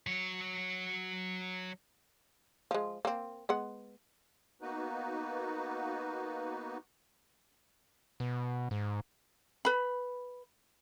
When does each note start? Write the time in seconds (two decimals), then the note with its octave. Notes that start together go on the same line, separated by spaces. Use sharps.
0.07 F#3 C#5
2.71 F3 G#3
3.05 A#3 C4
3.49 G#3 B3 F#5
4.62 A#3 B3 D#4 F#4 B4
8.20 B2
8.71 G#2
9.65 B4 B5